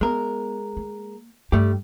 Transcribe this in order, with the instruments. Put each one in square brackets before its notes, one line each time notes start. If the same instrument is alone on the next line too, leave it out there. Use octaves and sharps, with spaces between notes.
[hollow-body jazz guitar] G#3 A#4 [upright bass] B3
[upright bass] A#3
[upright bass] G2 [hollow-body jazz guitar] G3 A3 G4